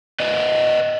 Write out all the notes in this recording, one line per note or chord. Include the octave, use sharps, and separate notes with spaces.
B4 D5 D#5